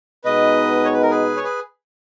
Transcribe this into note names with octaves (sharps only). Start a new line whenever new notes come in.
B2 G#3 B3 D#4 B4 D#5
C#5
B4
A#4
G#4 B4
C#5
G#4 B4